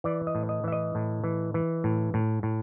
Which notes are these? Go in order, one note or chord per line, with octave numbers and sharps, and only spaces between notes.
E3 D5
D#5
A2
D#5
E3 E5
D#5
A2
E3
E3
A2
A2
A2